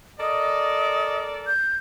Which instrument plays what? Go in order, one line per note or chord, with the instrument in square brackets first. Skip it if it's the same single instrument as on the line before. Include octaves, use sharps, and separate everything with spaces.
[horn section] A4 A#4 D5 [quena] D#5
[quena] G6